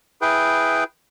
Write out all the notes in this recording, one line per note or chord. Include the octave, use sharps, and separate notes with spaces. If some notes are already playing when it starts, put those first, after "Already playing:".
E4 G#4 B4 G5